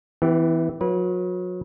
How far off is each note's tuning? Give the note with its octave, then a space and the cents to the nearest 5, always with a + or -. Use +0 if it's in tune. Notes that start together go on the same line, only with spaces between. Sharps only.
E3 -10 B3 +35 G4 +0
F#3 -35 B4 -35